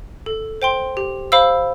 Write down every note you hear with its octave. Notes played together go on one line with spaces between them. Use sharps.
A4
C5 G5 C6
G4
C5 F5 B5 E6